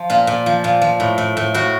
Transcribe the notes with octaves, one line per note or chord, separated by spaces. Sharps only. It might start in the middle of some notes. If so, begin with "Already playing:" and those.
Already playing: F3
A#2 F4
A#2
F3
A#2
F3
A2
A2
A2
A2 F#4